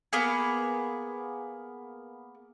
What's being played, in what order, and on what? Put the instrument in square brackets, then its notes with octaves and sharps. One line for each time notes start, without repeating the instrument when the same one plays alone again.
[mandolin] A#3 B3 G#4